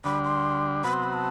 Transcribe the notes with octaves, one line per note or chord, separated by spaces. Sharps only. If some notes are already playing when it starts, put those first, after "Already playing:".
D2 D3 G3 D4 B5
C6
C3 F#3 B3 F#4 B5
C6
B5
A5